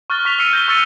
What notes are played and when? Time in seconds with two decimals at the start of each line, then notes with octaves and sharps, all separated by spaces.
0.10 C#6 F6 F#6 A6 G7
0.25 C#6 B6 F7
0.38 E6 F6 C7 C#7 D#7
0.53 G6 A#6 G7
0.68 C#6 E6 A6 C#7 D#7 G7